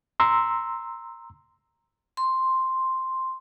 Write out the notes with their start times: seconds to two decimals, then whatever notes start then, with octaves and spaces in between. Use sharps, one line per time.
0.20 A#5 C6 E6
2.17 C6